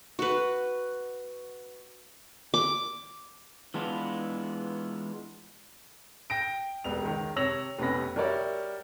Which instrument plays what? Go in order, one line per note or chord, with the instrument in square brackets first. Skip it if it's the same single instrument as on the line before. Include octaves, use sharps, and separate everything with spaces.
[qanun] F#4 B4
D6
[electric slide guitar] E3 G#3 B3 D4 F4 B4
[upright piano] G5 A#6 D7
E1 G3 B3 F7
C#2 D#3
C3 C#5 E6 A#6 F7 F#7
F1 C3 B3 C#4 B5 A#6
G3 F#4 A#4 C#5 D5 E5